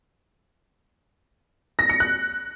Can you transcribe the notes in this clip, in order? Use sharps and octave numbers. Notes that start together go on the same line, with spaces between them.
A#6
C#7
F#6